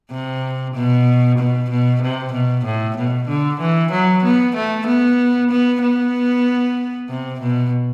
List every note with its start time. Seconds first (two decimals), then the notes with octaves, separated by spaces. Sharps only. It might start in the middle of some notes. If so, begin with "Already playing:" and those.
0.11 C3
0.75 B2
1.38 B2
1.70 B2
2.02 C3
2.33 B2
2.65 A2
2.97 B2
3.28 D3
3.60 E3
3.92 F#3
4.24 B3
4.56 A3
4.87 B3
5.51 B3
5.82 B3
7.09 C3
7.41 B2